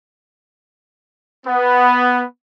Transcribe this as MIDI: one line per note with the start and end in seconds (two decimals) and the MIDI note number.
1.46 2.23 59